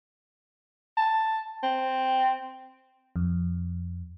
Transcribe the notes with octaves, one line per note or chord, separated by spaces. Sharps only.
A5
C4
F2